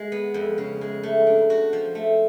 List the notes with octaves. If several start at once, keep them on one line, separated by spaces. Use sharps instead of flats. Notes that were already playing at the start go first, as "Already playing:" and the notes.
Already playing: G#3
B3
F2
C#3
G#3
A3
D4
F#4
F3
A3